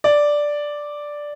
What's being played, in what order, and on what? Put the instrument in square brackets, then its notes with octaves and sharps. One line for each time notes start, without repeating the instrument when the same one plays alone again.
[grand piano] D5